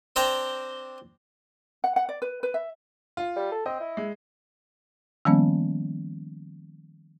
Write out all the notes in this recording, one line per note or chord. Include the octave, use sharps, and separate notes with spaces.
C4 D4 C5 D5 G5 A#5
F#5
F#5
D5
B4
B4
E5
F4
G3
A4
C4 D#5
E4
G#3
D#3 F3 G3 A#3 B3 C#4